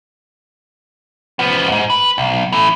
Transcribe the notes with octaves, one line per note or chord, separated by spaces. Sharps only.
F3 B3
D#2 G#2
B4
B1
E3 A3